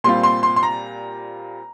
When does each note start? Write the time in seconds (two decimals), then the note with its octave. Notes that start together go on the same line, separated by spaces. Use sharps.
0.04 A#2 G3 C4 F4 C6
0.23 C6
0.43 C6
0.56 C6
0.63 A#5